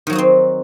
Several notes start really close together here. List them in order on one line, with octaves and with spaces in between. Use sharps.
D#3 F#3 F#4 D#4 C4